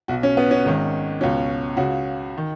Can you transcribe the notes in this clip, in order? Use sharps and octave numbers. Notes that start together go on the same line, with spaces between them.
B1 B2 F#4
C#4
B3
C#4
G#1 G#2 D#3
C#2 B2 C#4
C#2 C#3 F#4
D#3